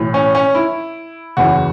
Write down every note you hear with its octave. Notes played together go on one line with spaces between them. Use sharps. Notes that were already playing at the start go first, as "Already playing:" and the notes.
Already playing: B1 A2 E3
C#4
C#4
E4
F#1 E2 E3 F#4